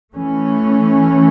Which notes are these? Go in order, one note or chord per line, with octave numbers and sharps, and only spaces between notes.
E3 A3 C#4